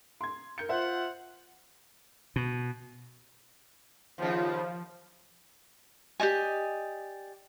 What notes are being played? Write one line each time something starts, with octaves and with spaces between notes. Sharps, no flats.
C6 G#6
A#4 G6 C#7
F4 C5 E5 F#5
B2
D#2 C#3 F3
G4 D5 D#5 G#5